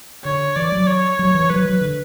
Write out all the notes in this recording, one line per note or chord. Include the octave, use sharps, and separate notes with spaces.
D3 C#5
E3 D5
F#3
C#5
F#3
E3
F#3 B4
F#3
D3